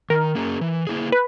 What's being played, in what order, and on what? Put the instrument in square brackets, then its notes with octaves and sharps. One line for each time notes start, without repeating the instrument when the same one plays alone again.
[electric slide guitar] D#3 [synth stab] A#4
[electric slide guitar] A#3 C#4 G#4
E3
A#3 E4 G#4
[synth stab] B4